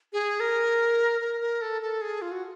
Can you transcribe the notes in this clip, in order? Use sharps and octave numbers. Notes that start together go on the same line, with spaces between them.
G#4
A#4
A#4
A#4
A4
A4
G#4
F4
F#4